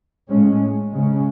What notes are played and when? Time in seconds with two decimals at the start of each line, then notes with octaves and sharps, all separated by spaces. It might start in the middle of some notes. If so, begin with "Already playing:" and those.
0.29 A2 G#3 C#4
0.94 C#3 G#3 C#4